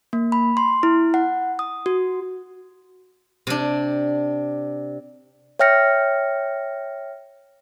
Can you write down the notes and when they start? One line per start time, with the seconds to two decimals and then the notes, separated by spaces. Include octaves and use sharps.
0.13 A#3
0.32 B5
0.57 C6
0.83 E4
1.14 F#5
1.59 D#6
1.86 F#4
3.47 C3 D4
5.59 C#5 E5 G5 F6 A#6 C#7